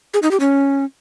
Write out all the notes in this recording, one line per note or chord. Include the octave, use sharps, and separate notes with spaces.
G#4
D#4
G4
C#4